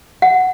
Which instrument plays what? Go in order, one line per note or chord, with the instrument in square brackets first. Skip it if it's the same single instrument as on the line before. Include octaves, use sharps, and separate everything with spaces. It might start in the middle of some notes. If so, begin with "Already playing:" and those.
[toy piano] F#5